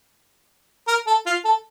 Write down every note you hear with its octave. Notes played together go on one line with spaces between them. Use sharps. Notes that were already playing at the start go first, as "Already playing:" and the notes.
A#4
A4
F4
A4